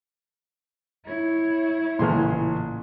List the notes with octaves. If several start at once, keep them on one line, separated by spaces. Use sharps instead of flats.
E4 C#5
A1 A#2 C#3 G#4 C6 F6